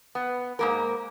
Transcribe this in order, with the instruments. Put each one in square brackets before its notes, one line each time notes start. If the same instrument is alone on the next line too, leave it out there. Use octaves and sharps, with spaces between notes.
[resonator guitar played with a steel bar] B3
G#2 A#3 A#4